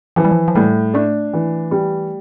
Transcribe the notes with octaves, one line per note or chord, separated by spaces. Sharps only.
E3 F3
G3
F3
F3
A2 G3
A3 D4
E3
G3